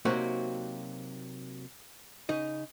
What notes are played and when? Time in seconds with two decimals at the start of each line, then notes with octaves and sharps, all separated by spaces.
0.05 C3 F#3 A#3 C4 D#4 F#4
2.29 C#3 D#4 D#5